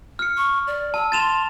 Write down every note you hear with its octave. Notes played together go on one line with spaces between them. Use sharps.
F6 C#7
C#6
D5
A5 E6
C6 A6 E7 F7